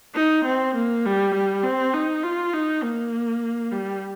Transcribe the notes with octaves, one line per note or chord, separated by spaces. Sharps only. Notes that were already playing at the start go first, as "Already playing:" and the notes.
D#4
C4
A#3
G3
G3
C4
D#4
F4
D#4
A#3
G3